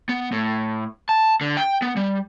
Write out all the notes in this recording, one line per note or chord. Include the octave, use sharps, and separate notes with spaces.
B3
A2
A5
D3
G5
B3
G3